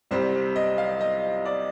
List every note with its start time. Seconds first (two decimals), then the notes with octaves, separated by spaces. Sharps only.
0.11 C2 C3 G3 C5
0.56 D#5
0.78 F5
1.01 D#5
1.45 D5